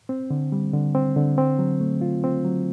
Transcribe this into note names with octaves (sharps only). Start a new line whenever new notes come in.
C4
D3
G3
D3
C4
D3
C4
F#3
A3
F4
C4
F#3